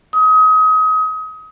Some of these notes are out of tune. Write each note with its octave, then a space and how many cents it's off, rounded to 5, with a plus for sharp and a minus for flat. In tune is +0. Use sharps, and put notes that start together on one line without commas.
D#6 +30